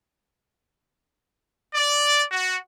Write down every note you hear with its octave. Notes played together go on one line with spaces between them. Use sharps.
D5
F#4